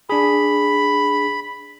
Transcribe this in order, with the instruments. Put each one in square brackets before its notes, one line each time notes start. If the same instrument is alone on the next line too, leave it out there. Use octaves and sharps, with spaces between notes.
[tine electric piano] D4 G#4 [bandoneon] B5